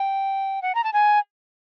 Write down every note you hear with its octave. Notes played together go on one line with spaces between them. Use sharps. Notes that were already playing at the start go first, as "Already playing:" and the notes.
Already playing: G5
F#5
A#5
A5
G#5